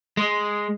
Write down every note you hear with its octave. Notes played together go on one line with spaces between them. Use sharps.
G#3